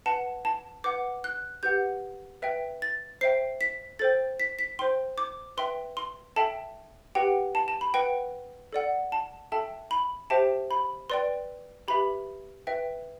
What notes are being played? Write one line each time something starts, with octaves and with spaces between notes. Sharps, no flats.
B4 F#5 A5
A5
B4 F#5 D6
F#6
G4 B4 F#5 G6
B4 E5 G5
A6
C5 E5 G5 C7
B6
A4 C5 G5 A6
B6
B6
C5 G5 C6
D6
B4 E5 G5 C6
C6
A4 E5 G5 A5
G4 B4 F#5 G5
A5
A5
B5
B4 F#5 G5
A4 D5 F#5
A5
A4 E5 G5 A5
B5
G4 C5 E5 G5 A5
B5
B4 D5 G5 C6
G4 B4 E5 B5
B4 E5 G5